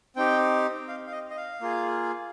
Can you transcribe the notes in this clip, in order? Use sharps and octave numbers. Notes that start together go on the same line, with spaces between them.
C4 D#4 G4 G5
F5
F5
D#5
D#5
F5
A#3 F4 G#4